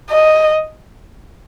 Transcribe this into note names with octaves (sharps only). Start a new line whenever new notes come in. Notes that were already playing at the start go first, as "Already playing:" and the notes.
D#5